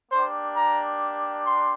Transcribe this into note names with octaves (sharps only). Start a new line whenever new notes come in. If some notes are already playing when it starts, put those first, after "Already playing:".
A#3 D4 G4 C5
A#5
C6